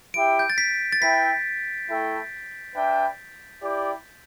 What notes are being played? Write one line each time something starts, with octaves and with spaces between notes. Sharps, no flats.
E4 G4 E5 G5 D7
G6
A6
B6
A6
E4 B4 E5 G5 B6
A3 E4 A4 G5
D4 B4 E5 G5
E4 G4 D5 G5